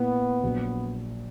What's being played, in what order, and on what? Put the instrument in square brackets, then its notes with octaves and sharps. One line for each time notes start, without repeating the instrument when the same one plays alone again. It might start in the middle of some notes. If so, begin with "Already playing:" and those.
Already playing: [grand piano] A#2 A#3 E4 [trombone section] B3
[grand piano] A#1 A#2 F#3